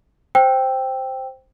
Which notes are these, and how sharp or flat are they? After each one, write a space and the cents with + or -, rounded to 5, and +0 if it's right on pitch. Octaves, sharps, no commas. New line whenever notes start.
C5 +0 G5 +0 E6 +0